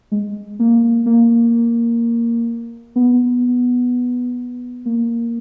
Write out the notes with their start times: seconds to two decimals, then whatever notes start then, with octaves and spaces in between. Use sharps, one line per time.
0.12 G#3
0.59 A#3
1.06 A#3
2.96 B3
4.86 A#3